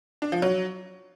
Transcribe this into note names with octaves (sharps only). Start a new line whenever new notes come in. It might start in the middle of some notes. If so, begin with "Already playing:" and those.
D4
F3
F#3